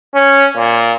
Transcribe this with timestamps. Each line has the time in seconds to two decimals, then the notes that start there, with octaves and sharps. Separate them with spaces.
0.14 C#4
0.57 A#2